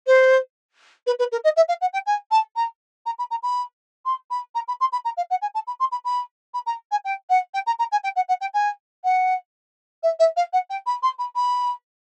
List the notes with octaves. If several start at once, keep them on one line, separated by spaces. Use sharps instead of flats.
C5
B4
B4
A#4
D#5
E5
F5
F#5
G5
G#5
A5
A#5
A#5
B5
A#5
B5
C6
B5
A#5
B5
C6
B5
A#5
F5
F#5
G#5
A5
B5
C6
B5
B5
B5
A#5
G#5
G5
F#5
G5
A#5
A#5
G#5
G5
F#5
F#5
G5
G#5
F#5
E5
E5
F5
F#5
G5
B5
C6
B5
B5